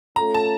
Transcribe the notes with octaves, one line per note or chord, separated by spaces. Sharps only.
A3 C#4 F4 A4 A#5
A5